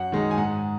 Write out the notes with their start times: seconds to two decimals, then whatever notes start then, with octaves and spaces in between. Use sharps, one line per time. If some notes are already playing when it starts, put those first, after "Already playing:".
Already playing: F#2 F#5
0.12 D#3 G#3 D#4
0.31 G#5
0.37 G#2 F#5